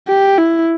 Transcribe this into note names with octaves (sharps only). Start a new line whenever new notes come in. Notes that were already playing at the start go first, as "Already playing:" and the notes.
G4
E4